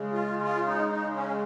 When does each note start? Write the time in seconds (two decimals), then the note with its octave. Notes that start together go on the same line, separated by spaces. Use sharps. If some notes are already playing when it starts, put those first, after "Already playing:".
Already playing: C#3 G#3
0.13 F4
0.44 F4
0.67 D#4
0.92 D#4
1.15 C#4